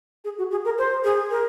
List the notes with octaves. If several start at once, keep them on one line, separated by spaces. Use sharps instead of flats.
G#4
F#4
G#4
A#4
C5
G#4
A#4